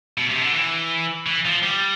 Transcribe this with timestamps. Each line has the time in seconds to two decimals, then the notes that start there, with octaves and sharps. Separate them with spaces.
0.18 B2
0.30 C3
0.41 D3
0.54 E3
1.27 E3
1.45 F3
1.63 G3